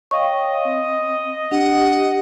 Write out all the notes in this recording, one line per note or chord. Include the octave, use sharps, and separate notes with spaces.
C#5 D#5 F5 G5 C#6
C4
D4 G4 F#5